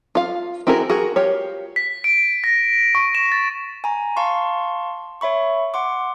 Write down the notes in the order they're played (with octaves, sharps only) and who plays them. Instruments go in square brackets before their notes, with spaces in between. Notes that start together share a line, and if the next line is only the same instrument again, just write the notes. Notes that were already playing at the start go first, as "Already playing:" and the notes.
[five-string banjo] F4 F5
C4 E4 F#4 G#4 A#4
F#4 G#4 A#4
F4 G4 C#5
[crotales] B6
D7
A#6
C#6
E7
A6
[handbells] G#5 A#5
F5 A5 C6 C#6
C#5 E5 B5 C#6
F#5 C6 D6